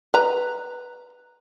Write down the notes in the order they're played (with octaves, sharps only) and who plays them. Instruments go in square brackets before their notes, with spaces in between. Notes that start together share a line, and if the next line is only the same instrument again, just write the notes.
[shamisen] B4 A#5